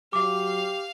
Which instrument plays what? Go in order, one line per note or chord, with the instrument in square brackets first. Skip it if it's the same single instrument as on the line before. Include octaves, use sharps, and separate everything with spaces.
[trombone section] F#3 [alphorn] G4 [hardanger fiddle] F5 [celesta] D6